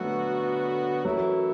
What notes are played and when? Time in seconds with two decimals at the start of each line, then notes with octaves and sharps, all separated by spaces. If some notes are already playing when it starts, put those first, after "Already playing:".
Already playing: D3 F#3 A3 B3 F#4
1.05 F#2 E3 F#3 A3 E4